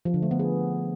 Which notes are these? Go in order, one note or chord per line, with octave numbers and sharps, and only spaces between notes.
F3
D3
A3
B3
G#4